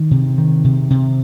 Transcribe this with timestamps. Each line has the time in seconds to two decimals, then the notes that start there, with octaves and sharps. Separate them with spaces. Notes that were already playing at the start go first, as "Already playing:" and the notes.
Already playing: D#3
0.11 C3
0.38 D#3
0.64 C3
0.90 C3